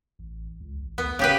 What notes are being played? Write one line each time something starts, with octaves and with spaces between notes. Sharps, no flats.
A1
C#2
A1
D2 B3
G1 C#3 G4 B4